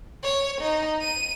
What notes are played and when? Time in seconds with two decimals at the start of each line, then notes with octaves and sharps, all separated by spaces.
0.23 C#5
0.61 D#4
1.01 D#7